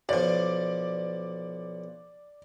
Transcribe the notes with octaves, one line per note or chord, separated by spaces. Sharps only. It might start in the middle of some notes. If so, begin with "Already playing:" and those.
B1 F3 D5